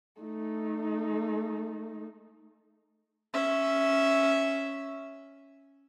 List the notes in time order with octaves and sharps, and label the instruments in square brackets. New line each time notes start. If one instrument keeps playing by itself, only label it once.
[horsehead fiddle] A3 D#4
[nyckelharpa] C#4 E5